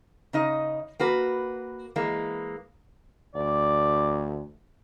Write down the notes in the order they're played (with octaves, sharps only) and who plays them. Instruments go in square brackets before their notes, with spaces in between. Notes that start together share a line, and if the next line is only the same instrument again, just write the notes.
[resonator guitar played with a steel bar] C#3 D#4 D#5
A#3 F#4 B4
E3 G#3 A#3
[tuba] D2 [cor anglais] D5